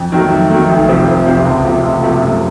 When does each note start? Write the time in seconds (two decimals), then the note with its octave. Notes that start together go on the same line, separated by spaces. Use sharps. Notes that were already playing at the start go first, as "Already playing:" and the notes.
Already playing: F2
0.12 D#3 F#3 A3
0.31 F2
0.50 D#3 F#3 A3
0.69 F1
0.88 F2 C3 F3 C4
1.07 F1
1.26 F2 C3 F3 C4
1.45 C#2
1.64 C3 F3 A3
1.83 C#2
2.03 C3 F3 A3
2.22 F#2